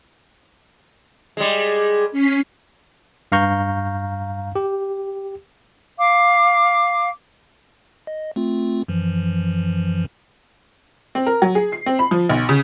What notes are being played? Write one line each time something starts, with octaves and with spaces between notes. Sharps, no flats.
G3 G#3
C#4 B6 C7
G2 F5 A#5 C#6 G6
G4
F5 D6
D#5
A3 C4 F4
F#2 E3 F3
C4
A#4
F#3
G#4
C7
C4
B5
F3
B1
C#3